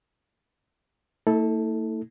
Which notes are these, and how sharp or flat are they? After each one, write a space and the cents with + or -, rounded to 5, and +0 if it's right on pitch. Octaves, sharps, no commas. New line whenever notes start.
A3 +45 E4 -35 A4 +0